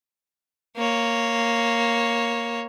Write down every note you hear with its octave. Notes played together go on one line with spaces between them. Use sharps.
A#3 C#5